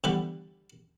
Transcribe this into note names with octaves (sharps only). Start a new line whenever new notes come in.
D3 E3 G3 B3